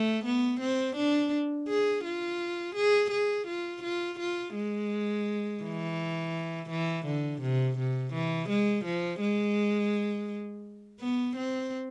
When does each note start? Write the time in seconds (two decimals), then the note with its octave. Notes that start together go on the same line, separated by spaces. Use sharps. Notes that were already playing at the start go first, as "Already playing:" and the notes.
Already playing: A3
0.25 B3
0.60 C4
0.96 D4
1.68 G#4
2.04 F4
2.76 G#4
3.11 G#4
3.48 F4
3.84 F4
4.20 F4
4.56 G#3
5.63 E3
6.70 E3
7.07 D3
7.42 C3
7.78 C3
8.14 E3
8.49 G#3
8.85 F3
9.21 G#3
11.00 B3
11.37 C4